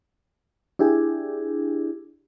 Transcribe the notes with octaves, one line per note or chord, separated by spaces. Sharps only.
D4 E4 G4 G#4